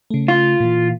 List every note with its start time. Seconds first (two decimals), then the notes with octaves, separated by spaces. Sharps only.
0.10 C#3 A3
0.28 F4
0.60 A#2 E3